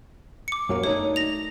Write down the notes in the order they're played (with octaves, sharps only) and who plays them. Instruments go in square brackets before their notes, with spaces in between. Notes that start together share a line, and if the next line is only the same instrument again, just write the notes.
[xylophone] D6 C#7
[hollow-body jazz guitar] F#2 F#3 A#3
[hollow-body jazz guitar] A3 D4 D#4 [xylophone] C#5
[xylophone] A#6 F7